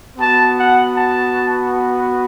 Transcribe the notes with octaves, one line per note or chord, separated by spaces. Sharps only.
B3 F#4 A5
F#5
A5